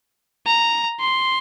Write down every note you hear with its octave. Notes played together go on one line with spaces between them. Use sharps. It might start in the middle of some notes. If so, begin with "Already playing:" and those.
A#5
C6